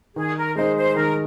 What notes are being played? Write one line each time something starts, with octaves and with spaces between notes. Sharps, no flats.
D#3 G#4
A#4
G#3 D#4 C5
C5
D#3 A#4